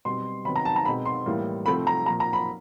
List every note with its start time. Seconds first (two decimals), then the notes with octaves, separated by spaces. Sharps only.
0.05 B2 G3 C4 C6
0.45 C3 D#3 F#3 B3 B5
0.56 A#5
0.65 A5
0.76 A#5
0.85 B2 G#3 C4 B5
1.06 C6
1.26 A2 E3 G3 A#3
1.66 C3 F3 A3 C4 B5
1.87 A#5
2.06 A#2 F3 A#3 A#5
2.20 A#5
2.33 B5